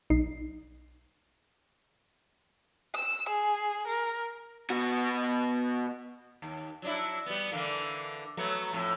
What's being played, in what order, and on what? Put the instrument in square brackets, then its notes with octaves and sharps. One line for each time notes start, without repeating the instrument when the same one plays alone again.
[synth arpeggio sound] B1 D#4 C7
[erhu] E6
G#4
A#4
[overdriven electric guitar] B2 F#4
[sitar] D#2
F#3 D4 E4
G3 B3
D3 E3 A#3
F#3 A3 B3
F2 A2